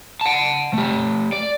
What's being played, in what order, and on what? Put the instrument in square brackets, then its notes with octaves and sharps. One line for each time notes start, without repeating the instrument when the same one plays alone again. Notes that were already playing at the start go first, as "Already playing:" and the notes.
[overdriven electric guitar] F#5 A5
A3 G4
D5